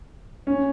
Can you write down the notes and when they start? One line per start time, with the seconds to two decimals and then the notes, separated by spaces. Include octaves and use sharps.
0.47 C#4